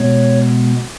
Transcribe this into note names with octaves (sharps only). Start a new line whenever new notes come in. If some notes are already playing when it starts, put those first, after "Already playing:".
Already playing: B2 G#3 B3 C#5